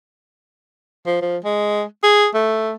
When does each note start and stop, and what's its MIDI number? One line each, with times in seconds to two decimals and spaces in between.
1.06 1.20 53
1.21 1.37 53
1.45 1.83 56
2.03 2.27 68
2.34 2.74 57